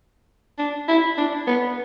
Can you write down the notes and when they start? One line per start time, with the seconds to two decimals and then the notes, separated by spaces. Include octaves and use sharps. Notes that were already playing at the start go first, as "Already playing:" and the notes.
0.59 D4
0.88 E4
1.18 D4
1.47 B3